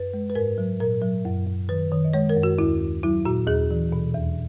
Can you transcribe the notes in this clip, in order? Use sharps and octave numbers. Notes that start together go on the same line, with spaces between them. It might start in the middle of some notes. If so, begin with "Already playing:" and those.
Already playing: F#2 B4
G#3
B4
G#2 A#4
F#3
A#2 A#4
F#3
F#2
F#2
D#3 B4
D#3
D#5
G#3 C#5
A#4
F#2
F#4
D#2 E4
D#2
F#3 E4
A#2 F#4
D#2 G#4
E3
B2
E2